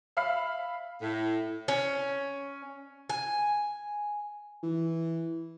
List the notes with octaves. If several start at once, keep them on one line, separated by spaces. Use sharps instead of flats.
E5 F5 B5 F6 C7
A2
C#4
G#5
E3